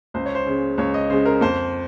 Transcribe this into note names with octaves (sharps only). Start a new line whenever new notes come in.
C#2 C5
C#5
C5
C#3 G#3
C#2 C#5
D#5
C#3 G#3 C5
A#4
F2 C5